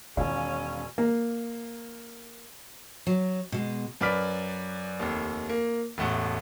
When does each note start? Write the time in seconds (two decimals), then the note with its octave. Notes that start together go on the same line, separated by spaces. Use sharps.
0.17 E1 D#3 C#4 F5 G#5
0.98 A#3
3.07 F#3
3.52 B2 G#3
4.01 F#2 B4 D5 F6 B6 D7
4.99 F1 D#2
5.49 A#3
5.98 E1 A1 A3 F#5